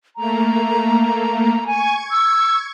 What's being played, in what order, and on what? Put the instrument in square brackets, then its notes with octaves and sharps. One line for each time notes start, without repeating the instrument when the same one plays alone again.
[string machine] A3 A#3 [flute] A#5
[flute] G#5 [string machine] C#6 G#6
[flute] E6